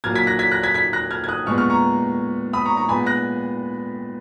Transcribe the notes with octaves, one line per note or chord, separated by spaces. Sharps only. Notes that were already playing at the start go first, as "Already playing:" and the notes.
A#2 F#3 A#3 F6 G#6
G#6 B6
F#6 A#6
G#6 B6
F#6 A#6
G#6 B6
G#6 B6
F#6 A#6
F6 G#6
G#6
D#6 F#6
A#2 G#3 B3 C#6 F6
C#6 F6
A#5 C#6
B5 D#6
A#5 C#6
A#5 C#6
A#2 G#3 B3 G#5 B5
F#6 A#6